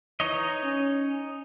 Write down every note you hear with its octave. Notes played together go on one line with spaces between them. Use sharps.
E3 D#4 C#5 D#5
C#4